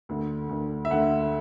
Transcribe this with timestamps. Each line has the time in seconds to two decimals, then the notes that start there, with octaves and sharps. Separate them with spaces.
0.09 D2 D3
0.49 D2 D3
0.85 E5
0.90 D2 D3 F#5